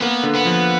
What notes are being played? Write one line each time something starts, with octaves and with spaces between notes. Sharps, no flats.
A#3 B3
D3
B3
F3